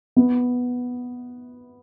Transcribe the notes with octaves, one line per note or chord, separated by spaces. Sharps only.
B3